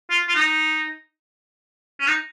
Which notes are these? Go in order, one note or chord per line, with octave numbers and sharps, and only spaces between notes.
F4
F4
D#4
C#4
D#4